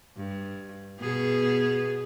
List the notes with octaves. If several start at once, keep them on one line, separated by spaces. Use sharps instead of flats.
G2
B2 B3 G#4